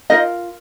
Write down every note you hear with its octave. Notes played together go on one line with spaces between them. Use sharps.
D#4 F4 A#4 D#5